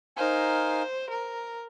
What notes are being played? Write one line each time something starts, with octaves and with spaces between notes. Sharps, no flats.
D#4 A#4 C5 F5 G#5
A#4